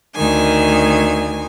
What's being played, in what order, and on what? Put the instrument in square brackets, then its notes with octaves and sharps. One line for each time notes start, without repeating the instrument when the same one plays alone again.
[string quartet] D2 D#3 G#5